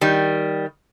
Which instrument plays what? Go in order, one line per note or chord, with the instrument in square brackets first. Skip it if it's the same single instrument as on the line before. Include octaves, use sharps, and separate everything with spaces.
[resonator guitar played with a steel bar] D#3 G3